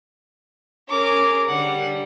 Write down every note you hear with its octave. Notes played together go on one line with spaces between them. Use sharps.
C#4 G#4 A#4 D6
D3 G3 F#5